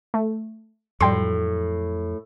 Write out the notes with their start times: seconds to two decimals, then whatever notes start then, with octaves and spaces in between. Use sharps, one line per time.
0.14 A3
1.01 F2 A2 F#3 G3 G5 C6